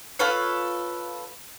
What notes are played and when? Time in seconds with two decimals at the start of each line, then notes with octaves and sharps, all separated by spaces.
0.19 F4 A4 B4 C#5